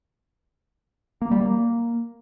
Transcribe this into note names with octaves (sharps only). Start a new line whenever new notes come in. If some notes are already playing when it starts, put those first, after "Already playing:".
A#3
G3
A#3